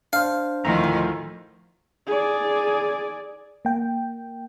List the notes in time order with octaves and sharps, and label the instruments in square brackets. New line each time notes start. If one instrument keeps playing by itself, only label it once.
[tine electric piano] D4 C5 [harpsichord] F5
[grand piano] D2 A2 [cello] D#3 F3 [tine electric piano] A#5
[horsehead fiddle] G#4 D5
[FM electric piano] A#3 G5